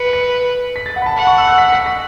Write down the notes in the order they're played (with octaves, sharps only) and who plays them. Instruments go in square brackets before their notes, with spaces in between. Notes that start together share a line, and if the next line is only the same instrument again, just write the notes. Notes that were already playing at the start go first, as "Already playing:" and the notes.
Already playing: [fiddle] B4 [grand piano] C#7
[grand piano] C#7
B6
A6
F#5
B5
A5
[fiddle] F#5 [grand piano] B5
[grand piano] C#6
E6
F#6
B6
B6
B6